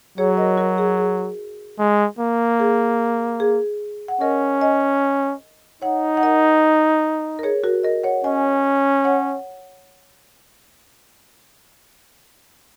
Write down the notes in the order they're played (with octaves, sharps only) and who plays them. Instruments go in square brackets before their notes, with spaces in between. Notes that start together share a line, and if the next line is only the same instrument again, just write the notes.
[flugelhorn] F#3 [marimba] G#4 C#5
[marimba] A#4 D#5
F#4 A#4
G#4
G#4
[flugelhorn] G#3
A#3
[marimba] G#4
G#4
F#5
[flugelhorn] C#4 [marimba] A#4 D#5
[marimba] D#5 G#5
[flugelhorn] D#4 [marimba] C#5 F#5
[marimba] F#5
A#4 D#5
A#4
G#4 C#5
F#4 A#4
A#4 D#5
C#5 F#5
[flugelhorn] C#4 [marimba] D#5 G#5
[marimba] C#5 F#5